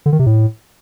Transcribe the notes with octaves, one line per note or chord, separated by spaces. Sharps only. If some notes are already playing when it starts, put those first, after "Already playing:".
D3
D#3
C3
A2